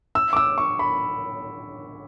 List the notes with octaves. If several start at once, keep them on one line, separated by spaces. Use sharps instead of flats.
E6
D6
E6
C#6
B5